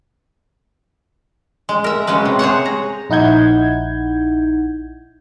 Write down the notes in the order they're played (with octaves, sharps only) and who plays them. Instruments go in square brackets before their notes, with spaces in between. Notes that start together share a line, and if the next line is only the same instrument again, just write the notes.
[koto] G#3
A#4 E5
C#3 F#3 G#3 B4
C3
G#4 C5 C#5 F#5
A#5
[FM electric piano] A#1 D#4 E4 F#5 G6 G#6